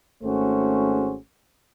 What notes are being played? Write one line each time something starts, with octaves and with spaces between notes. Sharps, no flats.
G#1 A3 C#4 F#4 G#4 C5